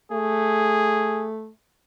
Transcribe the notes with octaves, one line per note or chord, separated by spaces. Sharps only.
A3 G#4